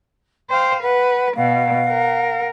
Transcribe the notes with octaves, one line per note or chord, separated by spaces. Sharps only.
C5 F5 G5
B4 F#5
B2 F5 F#5
A#4